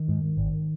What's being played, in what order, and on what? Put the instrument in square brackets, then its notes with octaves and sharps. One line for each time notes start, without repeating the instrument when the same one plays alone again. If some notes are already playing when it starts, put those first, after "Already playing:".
Already playing: [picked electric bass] D#3
G#2
G#1